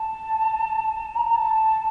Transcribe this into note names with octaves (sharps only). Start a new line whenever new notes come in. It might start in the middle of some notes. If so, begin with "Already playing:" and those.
Already playing: A5
A#5
A5